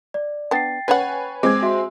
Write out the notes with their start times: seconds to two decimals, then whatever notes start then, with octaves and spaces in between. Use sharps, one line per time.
0.14 D5
0.51 B3 D4 G5 A6 C7
0.88 C#4 B4 C#5 F#5 G#5
1.43 G#3 C4 D6 G#6
1.62 F#4 E5 C6